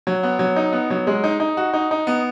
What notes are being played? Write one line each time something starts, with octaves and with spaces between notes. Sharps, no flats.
F#3
B3
F#3
D#4
B3
F#3
G#3
D#4
D#4
F#4
D#4
D#4
B3